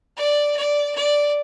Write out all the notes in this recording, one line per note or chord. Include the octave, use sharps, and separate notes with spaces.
D5
D5
D5